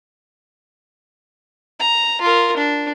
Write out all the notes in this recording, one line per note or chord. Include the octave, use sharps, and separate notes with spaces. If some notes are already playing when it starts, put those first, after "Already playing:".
A#5
F4 A#4
D4